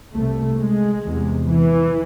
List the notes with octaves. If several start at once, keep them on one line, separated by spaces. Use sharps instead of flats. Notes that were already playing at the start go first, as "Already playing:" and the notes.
C2 C3 A3
G#3
E2 C3
E3